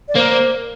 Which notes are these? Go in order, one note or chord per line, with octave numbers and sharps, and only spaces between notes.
D5
A#3 C5